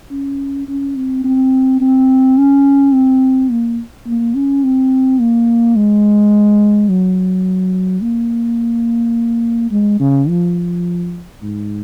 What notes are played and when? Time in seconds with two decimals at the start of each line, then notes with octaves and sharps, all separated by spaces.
0.11 C#4
0.68 C#4
0.96 C4
1.24 C4
1.81 C4
2.38 C#4
2.94 C4
3.51 A#3
4.07 A#3
4.35 C#4
4.64 C4
5.19 A#3
5.76 G#3
6.89 F#3
8.02 A#3
9.71 G#3
10.00 C#3
10.28 F3
11.42 G#2